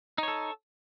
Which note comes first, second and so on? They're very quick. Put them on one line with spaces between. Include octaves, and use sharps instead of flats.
D#4 C#5 A4